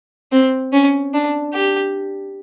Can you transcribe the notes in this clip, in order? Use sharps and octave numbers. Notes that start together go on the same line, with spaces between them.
C4
C#4
D4
G4